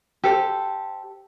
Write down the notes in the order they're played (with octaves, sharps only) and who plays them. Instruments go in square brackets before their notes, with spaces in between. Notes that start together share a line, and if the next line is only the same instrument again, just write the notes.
[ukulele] G4 A4 C5